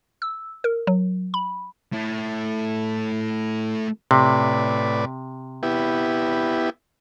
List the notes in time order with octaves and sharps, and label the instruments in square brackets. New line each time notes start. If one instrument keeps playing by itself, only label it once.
[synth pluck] E6
A#4
F#3
B5
[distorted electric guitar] A3 E4
[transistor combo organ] A2 B4 D5 [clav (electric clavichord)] C3
[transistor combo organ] B3 E4 G4